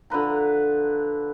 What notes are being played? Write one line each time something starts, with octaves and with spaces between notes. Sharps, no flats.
D3 F3 B4 A#5